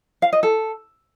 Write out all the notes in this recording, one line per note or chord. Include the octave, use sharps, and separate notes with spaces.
F5
D#5
A4